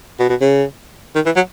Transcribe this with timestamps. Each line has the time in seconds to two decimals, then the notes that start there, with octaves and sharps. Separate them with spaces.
0.19 B2
0.30 B2
0.41 C#3
1.15 D#3
1.26 E3
1.36 F#3